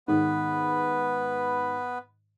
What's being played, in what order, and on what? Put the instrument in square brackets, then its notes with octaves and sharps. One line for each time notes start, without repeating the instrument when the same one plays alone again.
[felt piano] G#2 D#3 [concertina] B3 B4